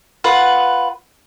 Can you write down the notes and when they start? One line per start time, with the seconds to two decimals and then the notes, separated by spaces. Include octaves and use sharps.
0.24 F4 B4 F#5